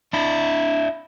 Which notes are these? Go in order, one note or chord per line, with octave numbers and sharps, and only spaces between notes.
D4 E4